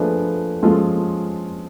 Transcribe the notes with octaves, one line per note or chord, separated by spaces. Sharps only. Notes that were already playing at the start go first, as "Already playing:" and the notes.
Already playing: F3 A3 D4 G#4 B4
F3 G#3 C#4 F4 A4